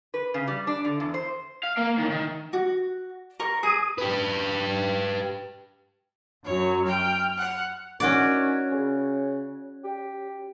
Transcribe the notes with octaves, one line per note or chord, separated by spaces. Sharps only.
B4
C#3
G3
D4
D3
E2
C5
F5
A#3
A2 D#3
D#3
F#4
A#4 C#6
G#4 D#6
G4 B4
F#2 F#3 C#5
G5 F6
F#5
D#3 C#4 F#4 D5
C#3
G4